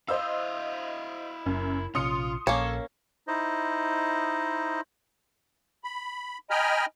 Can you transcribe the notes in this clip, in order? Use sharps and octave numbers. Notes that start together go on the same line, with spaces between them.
E4 C5 D#5 F5 E6
F#1 F#2
A#1 C3 C#4 F4 C6 D#6 C#7
A#1 A#3 C#4 A4 C#5
D#4 E4 C5 D#5
B5
D#5 G5 G#5 A#5 B5 F6